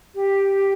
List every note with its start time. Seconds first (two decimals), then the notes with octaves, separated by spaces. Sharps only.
0.15 G4